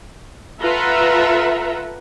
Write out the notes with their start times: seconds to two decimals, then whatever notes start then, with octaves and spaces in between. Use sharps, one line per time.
0.61 F4 A4 B4 E5 F#5 A#5